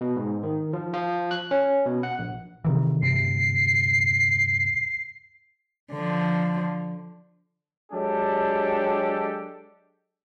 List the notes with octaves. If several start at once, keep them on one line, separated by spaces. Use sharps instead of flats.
B2
G#2
D#3
F3
F3
F#6
C#4
B2
F#5
A#1
C3 D#3 E3
D2 G2 C3 C7
D3 F3
F#3 G#3 D4 G4 A4